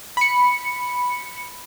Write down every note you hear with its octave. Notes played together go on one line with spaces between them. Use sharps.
B5 C#7